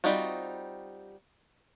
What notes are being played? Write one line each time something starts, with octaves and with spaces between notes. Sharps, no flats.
G3 C4 D#4 F4 F#4